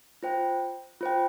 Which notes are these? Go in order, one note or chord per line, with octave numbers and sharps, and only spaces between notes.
F4 C5 G5
F4 C5 G5